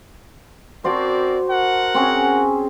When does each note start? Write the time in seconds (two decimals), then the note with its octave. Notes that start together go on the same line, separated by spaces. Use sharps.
0.84 C4 D4 F#4 A#4 C5 D5
1.48 A#4 F#5
1.94 C4 C#4 G#4